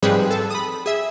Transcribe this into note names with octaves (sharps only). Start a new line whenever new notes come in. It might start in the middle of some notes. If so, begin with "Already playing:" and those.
G#2 F3 G3 C4 G#4 B4
A4
B5 D#6
G#4 E5